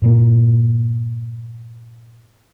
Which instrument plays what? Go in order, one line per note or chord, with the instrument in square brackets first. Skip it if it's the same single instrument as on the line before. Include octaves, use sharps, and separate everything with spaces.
[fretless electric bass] G2 A#2 A#3